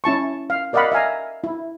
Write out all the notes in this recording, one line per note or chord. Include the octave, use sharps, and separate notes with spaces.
C#4 E4 A5 C#6
F5
A#4 D5 D#5 F5 F#5 B5
E5 F5 G#5 A#5
E4